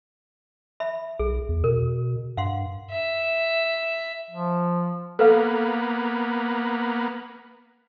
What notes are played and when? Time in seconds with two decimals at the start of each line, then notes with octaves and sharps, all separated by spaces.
0.80 E5 B5
1.19 B1 G#4
1.49 E2
1.64 B2 A#4
2.37 G2 F5 F#5 C6
2.91 E5
4.30 F3
5.19 A#3 B3 A4 B4 F5